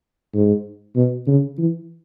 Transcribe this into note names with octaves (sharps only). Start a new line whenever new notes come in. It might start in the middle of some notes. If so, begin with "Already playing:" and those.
G#2
B2
C#3
E3